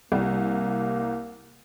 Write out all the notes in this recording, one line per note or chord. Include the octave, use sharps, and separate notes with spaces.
C2 G3 A#3